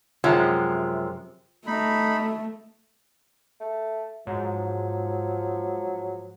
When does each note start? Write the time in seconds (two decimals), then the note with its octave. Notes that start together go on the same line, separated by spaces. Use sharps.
0.24 F#2 C3 F3 G#3
1.67 A3 D#4 B5
3.60 A3
4.27 G#2 F3 F#3